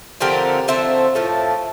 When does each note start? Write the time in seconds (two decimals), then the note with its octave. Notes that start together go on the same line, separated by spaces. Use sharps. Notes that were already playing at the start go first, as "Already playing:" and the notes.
0.20 D3 F3 A3 C4 G4 A#4
0.68 D3 F3 A3 C4 C5 E5
1.15 A2 F3 A3